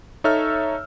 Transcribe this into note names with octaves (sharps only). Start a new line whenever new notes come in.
D#4 A4 C#5 E5 E6 F6